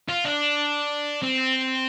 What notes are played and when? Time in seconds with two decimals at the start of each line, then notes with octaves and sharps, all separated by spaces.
0.09 F4
0.25 D4
1.23 C4